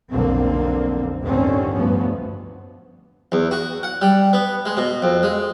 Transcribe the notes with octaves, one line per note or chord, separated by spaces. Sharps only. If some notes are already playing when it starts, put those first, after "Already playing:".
B1 F2 D3 A#3 C4
G1 D#2 A2 D3 C4 C#4
D2 G2 F3 B3
E2
F#4
F#5
G3
B3
G#3
B2
F2
G#3